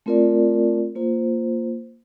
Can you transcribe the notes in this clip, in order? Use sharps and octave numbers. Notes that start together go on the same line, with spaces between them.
A3 C4 F4 A#4 D5
A#3 F4 C5